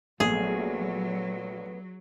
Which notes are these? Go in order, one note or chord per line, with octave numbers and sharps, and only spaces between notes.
A#1 F#3 A3 B3 G#4